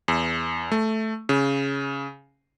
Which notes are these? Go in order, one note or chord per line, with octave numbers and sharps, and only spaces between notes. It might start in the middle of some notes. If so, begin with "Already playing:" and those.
E2
A3
C#3